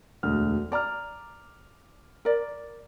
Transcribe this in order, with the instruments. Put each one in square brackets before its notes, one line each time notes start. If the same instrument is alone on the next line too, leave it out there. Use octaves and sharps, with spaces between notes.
[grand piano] E1 D2 F6
[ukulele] D5 A#5 [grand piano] D6 F6
[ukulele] A#4 D5